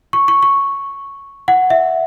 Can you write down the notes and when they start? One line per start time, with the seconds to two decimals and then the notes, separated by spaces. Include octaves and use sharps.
0.13 C#6
0.28 C#6
0.43 C#6
1.48 F#5
1.70 E5